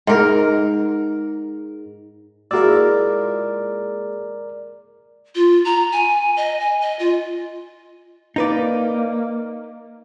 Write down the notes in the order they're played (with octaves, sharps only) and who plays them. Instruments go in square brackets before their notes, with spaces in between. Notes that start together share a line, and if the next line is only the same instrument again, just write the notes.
[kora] G#2 A#4
[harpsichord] A#2 G#3 E4 [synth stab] F#4 E6 [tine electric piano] A#4 D5
[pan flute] F4
A#5
G#5
D#5
G#5
D#5
F4
[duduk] A#3 [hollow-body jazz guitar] D#4 B4 D5